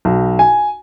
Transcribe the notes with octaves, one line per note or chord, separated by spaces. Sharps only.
B1
G#5